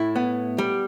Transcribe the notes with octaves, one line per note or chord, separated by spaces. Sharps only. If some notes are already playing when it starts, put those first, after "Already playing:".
Already playing: A2 E4
B3
G3